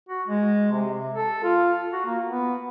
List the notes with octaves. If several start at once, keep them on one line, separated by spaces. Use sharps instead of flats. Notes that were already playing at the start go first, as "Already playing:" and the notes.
F#4
G#3
C3
A4
F4
F#4
A#3
B3